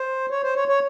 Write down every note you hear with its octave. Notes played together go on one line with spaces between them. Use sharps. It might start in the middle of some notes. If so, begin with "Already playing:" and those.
Already playing: C5
C#5
C5
C#5
C#5